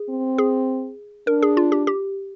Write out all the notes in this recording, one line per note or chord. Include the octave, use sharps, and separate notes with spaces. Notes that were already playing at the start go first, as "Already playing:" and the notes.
Already playing: G#4
C4
G#4
D4 A#4
G#4
F4
G4
G4